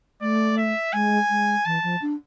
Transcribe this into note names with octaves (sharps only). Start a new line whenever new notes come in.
A3 D5
E5
G#3 G#5
G#3
E3 A5
F3
D4